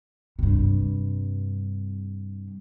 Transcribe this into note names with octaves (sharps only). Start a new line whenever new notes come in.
G2 C3